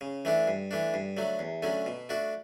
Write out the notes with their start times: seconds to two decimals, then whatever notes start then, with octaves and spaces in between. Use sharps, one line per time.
0.01 C#3
0.25 E3 A3 D4
0.47 G2
0.71 E3 A3 D4
0.94 G2
1.17 D3 F#3 A3
1.39 E2
1.63 D3 F#3 A3 C#4
1.86 B2
2.09 A3 D4 F#4